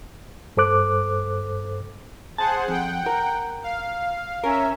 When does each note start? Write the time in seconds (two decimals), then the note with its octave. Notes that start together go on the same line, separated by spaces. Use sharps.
0.57 G2 A4 C5 D6 F#6
2.38 G#4 C5 F#5 A5
2.68 F2 F#5 G5
3.06 A#4
3.63 F5
4.44 C#4 A#4 E5